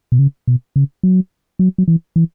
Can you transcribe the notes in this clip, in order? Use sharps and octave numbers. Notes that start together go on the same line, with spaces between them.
B2
C#3
B2
C#3
F#3
F#3
F#3
E3
E3